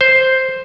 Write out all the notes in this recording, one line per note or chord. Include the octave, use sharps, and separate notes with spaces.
C5